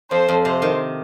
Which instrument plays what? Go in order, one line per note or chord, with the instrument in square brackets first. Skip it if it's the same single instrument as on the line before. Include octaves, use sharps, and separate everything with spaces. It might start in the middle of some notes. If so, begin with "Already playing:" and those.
[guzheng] F2 [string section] C5
[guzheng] F2
[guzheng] C3 [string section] C5
[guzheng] D#3